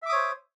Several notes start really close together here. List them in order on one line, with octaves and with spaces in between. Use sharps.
E5 D6 D#6 C#5 C5